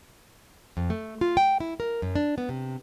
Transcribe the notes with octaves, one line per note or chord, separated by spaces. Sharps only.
F2
A3
F4
G5
E4
A#4
F#2
D4
B3
C3